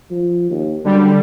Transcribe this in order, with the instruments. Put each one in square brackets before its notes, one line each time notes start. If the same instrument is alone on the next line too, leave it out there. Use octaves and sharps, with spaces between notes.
[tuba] F3
D#2
[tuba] F#2 [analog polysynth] D3 G3